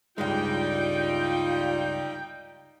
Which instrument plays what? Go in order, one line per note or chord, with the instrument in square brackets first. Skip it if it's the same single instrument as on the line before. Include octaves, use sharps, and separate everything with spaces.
[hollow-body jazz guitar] C#2 G2 G#3 [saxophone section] G3 D#4 [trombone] F4 [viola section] G5